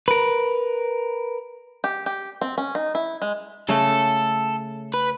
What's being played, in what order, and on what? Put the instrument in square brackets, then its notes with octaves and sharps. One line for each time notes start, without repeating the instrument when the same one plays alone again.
[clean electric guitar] A#4 B4
[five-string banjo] G4
G4
C4
C#4
D#4
E4
G#3
[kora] C#3 A3 [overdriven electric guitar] A4
[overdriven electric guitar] B4